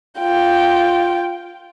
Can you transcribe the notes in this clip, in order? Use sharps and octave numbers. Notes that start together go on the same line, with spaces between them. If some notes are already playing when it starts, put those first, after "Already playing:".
F4 G5